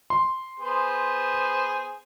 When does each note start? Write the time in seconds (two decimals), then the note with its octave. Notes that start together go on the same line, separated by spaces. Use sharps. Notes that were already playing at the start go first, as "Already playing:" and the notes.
0.10 C6
0.59 B3 G#4 C5